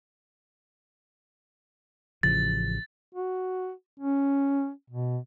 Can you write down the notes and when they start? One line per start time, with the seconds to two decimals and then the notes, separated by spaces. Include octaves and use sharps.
2.23 A1 C#3 F3 A6
3.14 F#4
3.99 C#4
4.90 B2